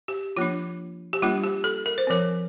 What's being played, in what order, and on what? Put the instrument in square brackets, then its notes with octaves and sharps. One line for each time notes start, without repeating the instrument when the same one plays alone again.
[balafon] G4
F3 A#3 D4 F4
G4
G3 A#3 D4 F4
G4
A4
A#4
C5
F3 C4 A#4